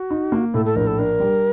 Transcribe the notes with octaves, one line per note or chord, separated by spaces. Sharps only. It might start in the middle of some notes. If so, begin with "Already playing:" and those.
Already playing: F#4
D#4
A#3
A2 A4
A4
A#1 A#4
A4
D4 A#4
G3